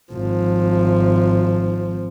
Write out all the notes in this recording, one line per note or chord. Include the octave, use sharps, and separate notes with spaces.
G#1 F3